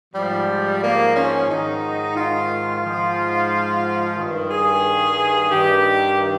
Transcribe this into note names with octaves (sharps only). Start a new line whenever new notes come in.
G#2 F3 G3
A#3
C#4
G#2 D#3 D#4
F4
G#2 F3
G2 D#3
G#4
G2 D#3 G4